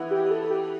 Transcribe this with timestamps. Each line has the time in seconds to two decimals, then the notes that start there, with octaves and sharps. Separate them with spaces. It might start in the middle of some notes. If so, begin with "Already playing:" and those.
Already playing: E3 B3
0.11 G4
0.30 A4
0.50 G4